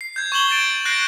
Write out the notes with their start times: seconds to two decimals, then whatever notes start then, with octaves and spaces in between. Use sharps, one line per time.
0.01 C7
0.16 G6 G#6
0.32 C#6 G#6 E7 F#7 G7
0.51 A6 D7
0.85 F#6 G6 A#6 C7 D7